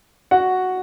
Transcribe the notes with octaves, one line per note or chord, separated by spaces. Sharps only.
F#4 F#5